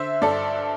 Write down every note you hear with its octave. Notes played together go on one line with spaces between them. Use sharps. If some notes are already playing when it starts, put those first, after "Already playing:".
Already playing: D3 C5 E5
G2 A4 D5